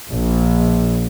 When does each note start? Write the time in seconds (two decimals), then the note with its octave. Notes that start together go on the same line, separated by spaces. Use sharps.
0.10 A#1